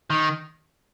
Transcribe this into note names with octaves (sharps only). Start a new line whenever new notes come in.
D#3